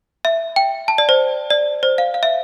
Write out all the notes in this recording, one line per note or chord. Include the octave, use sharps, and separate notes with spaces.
E5
G5
A5
D5
C5
D5
C5
F5
F5
E5